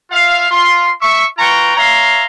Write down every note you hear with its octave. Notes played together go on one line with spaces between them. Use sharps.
F4 E5 F5
F4 C6
E5 C#6
F4 B4 G5 A#5 C#6
C#5 E5 F5 A#5 C6